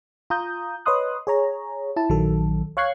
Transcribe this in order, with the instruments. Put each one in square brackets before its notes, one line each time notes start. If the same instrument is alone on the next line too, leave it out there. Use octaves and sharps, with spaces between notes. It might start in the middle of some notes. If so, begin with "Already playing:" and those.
[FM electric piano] F4 A#5 D#6 G6
B4 C#5 D#5 C6 D#6 F#6
G#4 C#5 A#5
E4 A5
A#1 D#3 F#3 A4
C#5 F5 C#6 F#6 G#6 C7